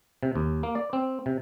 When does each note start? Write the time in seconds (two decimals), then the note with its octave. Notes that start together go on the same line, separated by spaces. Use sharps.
0.23 C3
0.36 D#2
0.63 A#3
0.75 D5
0.93 C4
1.26 C3